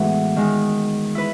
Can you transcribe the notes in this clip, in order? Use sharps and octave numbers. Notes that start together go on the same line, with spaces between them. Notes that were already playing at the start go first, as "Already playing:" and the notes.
Already playing: A2 E3 G#3 B3 F#4
D#3 G#3 D#4
E4 B4